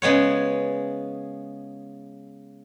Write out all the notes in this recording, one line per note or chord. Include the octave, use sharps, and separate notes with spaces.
C#3 G#3 B3 C#5